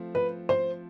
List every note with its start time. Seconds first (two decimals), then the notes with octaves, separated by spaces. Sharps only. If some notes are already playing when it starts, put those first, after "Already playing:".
Already playing: F3 A3 C4
0.15 B4
0.49 C5